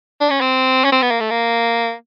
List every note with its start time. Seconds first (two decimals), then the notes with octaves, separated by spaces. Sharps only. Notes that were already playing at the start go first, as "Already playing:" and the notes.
0.21 D4
0.30 C#4
0.41 C4
0.84 C#4
0.92 C4
1.02 B3
1.11 A#3
1.20 A3
1.30 A#3